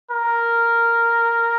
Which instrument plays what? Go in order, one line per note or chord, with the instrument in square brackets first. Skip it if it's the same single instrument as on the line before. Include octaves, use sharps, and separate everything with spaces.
[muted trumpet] A#4